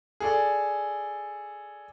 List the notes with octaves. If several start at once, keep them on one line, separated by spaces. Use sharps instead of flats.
G#4 A4 D5